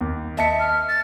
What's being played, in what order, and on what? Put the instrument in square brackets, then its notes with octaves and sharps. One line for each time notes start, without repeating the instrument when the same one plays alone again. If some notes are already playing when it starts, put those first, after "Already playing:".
[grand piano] D#2
[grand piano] D#5 A5 C#7 [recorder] E5
[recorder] F6
A6